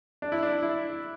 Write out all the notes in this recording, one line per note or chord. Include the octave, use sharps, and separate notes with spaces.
D4
E4
D4
E4